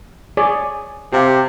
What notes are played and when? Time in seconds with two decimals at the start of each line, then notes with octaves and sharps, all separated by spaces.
0.37 G#4 C#5 D5
1.13 C3 G4 F5